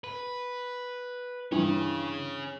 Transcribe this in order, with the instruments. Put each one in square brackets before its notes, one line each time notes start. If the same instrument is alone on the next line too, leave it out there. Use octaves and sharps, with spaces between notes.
[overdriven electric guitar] B4
[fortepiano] G2 E3 [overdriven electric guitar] C#4 G#4